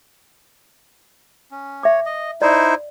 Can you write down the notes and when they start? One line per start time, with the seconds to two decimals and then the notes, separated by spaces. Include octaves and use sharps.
1.51 C#4
1.83 C#5 E5 D6
2.06 D#5
2.42 D#4 E4 C5 D5